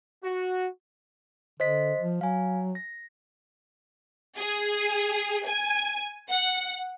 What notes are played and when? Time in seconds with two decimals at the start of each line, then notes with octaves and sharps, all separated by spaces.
0.23 F#4
1.60 D3 C5 D#5 B6
1.99 F3
2.21 F#3 F5 G#5
2.75 A#6
4.38 G#4
5.45 G#5
6.30 F#5